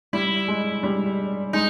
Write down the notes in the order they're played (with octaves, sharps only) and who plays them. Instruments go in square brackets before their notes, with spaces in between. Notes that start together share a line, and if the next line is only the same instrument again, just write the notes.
[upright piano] G3 [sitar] E4
[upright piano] G#3
G3
[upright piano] G#3 [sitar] D#4